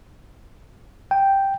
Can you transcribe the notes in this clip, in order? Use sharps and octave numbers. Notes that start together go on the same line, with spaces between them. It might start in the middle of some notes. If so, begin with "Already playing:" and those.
G5